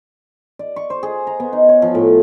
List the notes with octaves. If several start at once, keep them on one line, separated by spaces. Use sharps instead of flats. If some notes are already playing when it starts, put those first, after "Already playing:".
D5
C#6
C5
G#4
A#5
B3
D#4
C#5
F3
A2